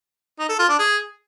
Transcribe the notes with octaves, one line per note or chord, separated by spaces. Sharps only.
D#4
A4
F4
D4
G#4